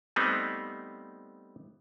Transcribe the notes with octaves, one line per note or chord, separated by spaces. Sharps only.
G3 A3 B3 C4 D#4